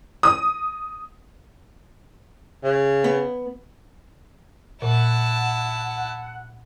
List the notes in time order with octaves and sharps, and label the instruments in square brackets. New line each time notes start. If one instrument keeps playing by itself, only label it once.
[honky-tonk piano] D#6
[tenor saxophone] C#3
[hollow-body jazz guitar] B3
[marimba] A#2 [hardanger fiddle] E4 A5 [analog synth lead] F#5